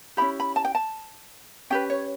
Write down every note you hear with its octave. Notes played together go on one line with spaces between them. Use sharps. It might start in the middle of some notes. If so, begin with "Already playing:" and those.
C#4 E4 G4 B5
B5
A5
G5
A5
C#4 G4 B4 G5
C#5